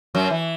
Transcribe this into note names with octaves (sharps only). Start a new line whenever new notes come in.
F#2 F#3
E3